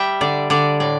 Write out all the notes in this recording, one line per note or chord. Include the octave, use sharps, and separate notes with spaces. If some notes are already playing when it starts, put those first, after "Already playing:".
Already playing: G3 E5 G5
D3 D5
D3 D5
A2 D5